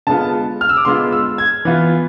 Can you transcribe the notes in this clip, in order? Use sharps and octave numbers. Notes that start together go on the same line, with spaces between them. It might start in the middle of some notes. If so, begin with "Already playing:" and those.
D3 G#3 B3 F4 A5
F6
E6
D6
D3 G#3 B3 F4 C6
E6
G#6
E3 B3 F4